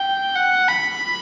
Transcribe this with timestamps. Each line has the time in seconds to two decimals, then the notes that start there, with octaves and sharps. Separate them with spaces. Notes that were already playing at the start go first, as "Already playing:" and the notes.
Already playing: G5
0.36 F#5
0.68 B5